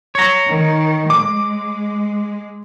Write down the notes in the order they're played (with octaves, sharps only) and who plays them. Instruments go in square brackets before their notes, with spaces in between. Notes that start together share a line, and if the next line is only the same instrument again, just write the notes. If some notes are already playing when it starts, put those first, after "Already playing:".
[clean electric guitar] C#5 A#5
[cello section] D#3
[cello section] G#3 [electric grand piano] D6